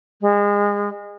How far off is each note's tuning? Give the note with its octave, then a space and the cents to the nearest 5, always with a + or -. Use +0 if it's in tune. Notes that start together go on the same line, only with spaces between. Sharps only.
G#3 -30